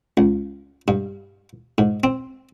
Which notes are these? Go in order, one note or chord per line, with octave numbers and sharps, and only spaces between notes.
C#2
G2
G#2
C4